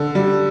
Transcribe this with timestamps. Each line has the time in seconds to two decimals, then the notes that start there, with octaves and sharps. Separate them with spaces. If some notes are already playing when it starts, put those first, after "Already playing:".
Already playing: D3 A4
0.15 G3